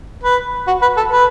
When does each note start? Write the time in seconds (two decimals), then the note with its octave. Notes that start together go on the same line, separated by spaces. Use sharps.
0.24 B4
0.67 F#4
0.82 B4
0.97 A4
1.11 B4